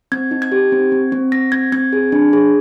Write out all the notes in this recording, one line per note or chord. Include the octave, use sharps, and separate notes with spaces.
C4 G#6
D#4
G#6
G4
C4
C4
C4
C4 A#6
C4 G#6
C4 G#6
G#4
D4
G#4